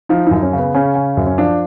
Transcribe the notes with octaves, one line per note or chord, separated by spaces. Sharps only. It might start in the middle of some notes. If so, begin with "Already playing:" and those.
F3 D#4
F#2 D#4
C#4
C#3
B3
C#3 C#4
C#3
F#2
C#4
F3 D4